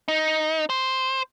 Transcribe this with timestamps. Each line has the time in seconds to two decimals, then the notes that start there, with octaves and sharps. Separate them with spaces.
0.08 D#4
0.70 C5